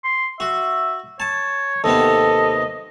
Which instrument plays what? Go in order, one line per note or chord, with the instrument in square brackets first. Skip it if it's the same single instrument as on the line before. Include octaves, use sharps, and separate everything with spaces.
[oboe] C6
[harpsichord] F#4 [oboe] E5
[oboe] C#5 [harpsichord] A5
[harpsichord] D#2 C3 B3 [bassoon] A4 [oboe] D#5